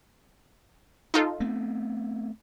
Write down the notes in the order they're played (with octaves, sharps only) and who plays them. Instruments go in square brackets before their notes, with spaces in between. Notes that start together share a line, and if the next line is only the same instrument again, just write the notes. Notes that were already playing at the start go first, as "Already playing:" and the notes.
[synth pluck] D#4 F4 A4
[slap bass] A3 B3 C4